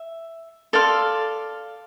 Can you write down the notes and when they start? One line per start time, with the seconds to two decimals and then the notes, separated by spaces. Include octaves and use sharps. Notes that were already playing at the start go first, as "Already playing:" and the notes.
Already playing: E5
0.73 A4 D5 F5 C6